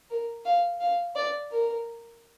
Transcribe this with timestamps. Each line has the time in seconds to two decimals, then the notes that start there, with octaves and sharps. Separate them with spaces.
0.10 A#4
0.45 F5
0.80 F5
1.15 D5
1.51 A#4